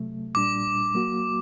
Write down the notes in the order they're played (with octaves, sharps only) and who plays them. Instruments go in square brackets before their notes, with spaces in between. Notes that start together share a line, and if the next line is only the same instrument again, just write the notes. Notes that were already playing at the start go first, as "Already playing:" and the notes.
Already playing: [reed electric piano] C3 F#3 A3
[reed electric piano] A#2 G3 D4 [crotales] D6
[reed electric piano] F#3 A#3 F#4